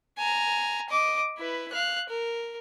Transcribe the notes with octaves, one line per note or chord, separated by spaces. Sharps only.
G#5 A#5
D#5 D6
E4 B4
F5 F#6
A#4